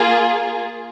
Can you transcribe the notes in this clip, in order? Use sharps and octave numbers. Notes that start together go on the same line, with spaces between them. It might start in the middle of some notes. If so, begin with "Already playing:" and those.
Already playing: A#3 F4 G#4